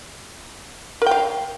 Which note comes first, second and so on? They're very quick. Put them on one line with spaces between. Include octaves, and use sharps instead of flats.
A#4 G5 F5